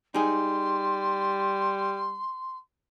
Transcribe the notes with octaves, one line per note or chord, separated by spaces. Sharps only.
G3 D#4 G#4 C6